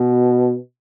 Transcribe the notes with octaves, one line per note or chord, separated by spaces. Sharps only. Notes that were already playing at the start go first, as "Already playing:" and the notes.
Already playing: B2